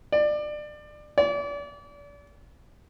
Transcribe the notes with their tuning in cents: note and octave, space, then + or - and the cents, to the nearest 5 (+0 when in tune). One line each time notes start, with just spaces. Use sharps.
D5 +25
D5 -35